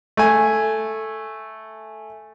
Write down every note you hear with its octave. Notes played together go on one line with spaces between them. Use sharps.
A3 G#5